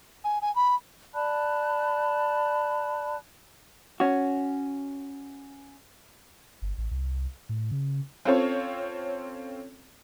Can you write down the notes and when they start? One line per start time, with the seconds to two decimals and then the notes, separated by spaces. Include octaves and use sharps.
0.24 G#5
0.42 G#5
0.56 B5
1.14 D5 A5 B5 F#6
4.00 C#4 F#4
6.62 G1
6.78 A1
6.91 C2
7.49 A2
7.72 C#3
8.25 C4 C#4 F4 A4 C5 C#5